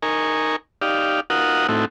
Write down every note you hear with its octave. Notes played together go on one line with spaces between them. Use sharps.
D#4 A#4 G#5 C#6
D#4 G4 D5 F5
D#4 F4 F#4 A#4 F#5 D#6
A2 A3 C4 D#4 E4 F#4